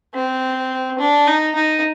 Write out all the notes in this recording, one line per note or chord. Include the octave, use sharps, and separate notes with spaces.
C4
D4
D#4
D#4